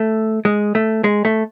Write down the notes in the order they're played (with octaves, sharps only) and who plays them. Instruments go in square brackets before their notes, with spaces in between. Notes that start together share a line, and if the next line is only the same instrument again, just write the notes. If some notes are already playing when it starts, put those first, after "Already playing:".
Already playing: [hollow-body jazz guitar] A3
G#3
A3
G#3
A3